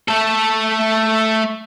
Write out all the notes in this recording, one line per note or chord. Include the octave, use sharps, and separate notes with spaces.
A3 A4